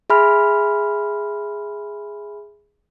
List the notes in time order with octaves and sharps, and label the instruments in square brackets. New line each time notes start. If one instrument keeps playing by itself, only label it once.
[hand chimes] G#4 E5 G#5 B5 C6 F6